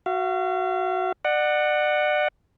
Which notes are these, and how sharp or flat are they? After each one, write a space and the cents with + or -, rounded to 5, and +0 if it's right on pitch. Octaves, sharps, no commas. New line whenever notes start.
F#4 +0 F5 -40
D5 +35 F#5 +0